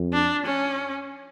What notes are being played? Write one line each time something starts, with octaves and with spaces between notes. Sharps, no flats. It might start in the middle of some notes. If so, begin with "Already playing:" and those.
Already playing: F2
D4
C#4